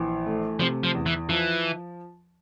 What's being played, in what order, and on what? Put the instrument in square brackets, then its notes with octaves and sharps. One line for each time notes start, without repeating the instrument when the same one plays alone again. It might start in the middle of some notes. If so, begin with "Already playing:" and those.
Already playing: [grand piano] A#1 E3
A3
[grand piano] C3 [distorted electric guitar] F3
[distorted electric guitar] F3
[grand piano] E2
[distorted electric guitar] E3
[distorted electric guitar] E3 [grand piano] F3